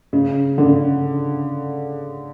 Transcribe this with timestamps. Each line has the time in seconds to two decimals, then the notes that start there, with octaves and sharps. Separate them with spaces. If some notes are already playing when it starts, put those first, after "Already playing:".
0.13 C#3
0.58 D3
0.65 C#3